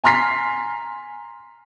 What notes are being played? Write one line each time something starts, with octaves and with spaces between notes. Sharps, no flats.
G#5 A#5 C6 F6 B6 C7